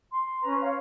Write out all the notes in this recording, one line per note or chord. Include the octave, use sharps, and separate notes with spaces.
C6
C#4 B4 A#5
C#5 F5